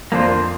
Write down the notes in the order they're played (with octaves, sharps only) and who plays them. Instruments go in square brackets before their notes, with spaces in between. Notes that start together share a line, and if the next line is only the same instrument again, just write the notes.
[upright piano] F2 F3 [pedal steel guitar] A#3 D4 F4 C5